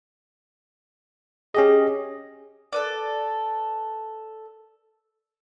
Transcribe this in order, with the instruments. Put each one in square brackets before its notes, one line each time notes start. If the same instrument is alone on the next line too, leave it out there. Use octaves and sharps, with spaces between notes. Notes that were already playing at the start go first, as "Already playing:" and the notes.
[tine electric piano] C#4 G4 D#5 [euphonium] G#4
[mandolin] A4 B4 D5